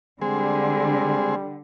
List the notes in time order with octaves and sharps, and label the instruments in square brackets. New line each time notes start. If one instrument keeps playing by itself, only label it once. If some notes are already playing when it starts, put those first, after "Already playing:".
[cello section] D3 [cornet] G3 [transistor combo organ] G#3 C4 G#4